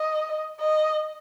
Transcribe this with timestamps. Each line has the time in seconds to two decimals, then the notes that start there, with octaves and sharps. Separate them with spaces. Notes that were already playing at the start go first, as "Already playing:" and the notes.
Already playing: D#5
0.60 D#5